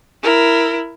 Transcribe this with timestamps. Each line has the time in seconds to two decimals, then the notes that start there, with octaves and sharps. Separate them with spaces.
0.23 E4 A#4